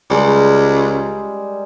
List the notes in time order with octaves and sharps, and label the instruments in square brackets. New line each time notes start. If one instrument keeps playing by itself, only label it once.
[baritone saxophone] C#2 [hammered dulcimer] G3 G#3 A#4